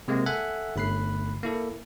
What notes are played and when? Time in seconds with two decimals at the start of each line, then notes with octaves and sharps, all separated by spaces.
0.08 C3 G#3 A#3 C4
0.26 A4 E5 F#5 G#5 F#6
0.76 G1 A3 B5 F#6 C7
1.43 A#3 E4 A4